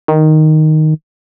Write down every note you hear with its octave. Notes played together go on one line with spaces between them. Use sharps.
D#3